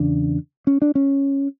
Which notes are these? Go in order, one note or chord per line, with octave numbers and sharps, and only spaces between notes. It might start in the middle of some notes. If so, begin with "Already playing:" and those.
Already playing: E2 C#3 D4
C#4
D4
C#4